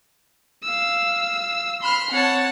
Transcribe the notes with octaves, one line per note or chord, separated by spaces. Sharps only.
F5 E6
B5 C6 F6
C4 C#5 F#5 A5